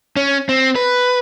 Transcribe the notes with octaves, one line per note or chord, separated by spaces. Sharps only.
C#4
C4
B4